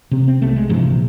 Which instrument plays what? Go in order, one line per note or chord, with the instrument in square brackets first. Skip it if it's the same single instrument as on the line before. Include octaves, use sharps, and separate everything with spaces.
[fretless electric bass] C3 C4
C4
B1 C3 A3
G#3
G2 C3 E3 F3
A#1